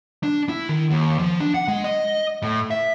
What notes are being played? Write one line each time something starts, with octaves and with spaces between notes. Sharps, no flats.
D4
E4
D#3
D#2
F3
D4
F#5
G#3
D#5
A2
E5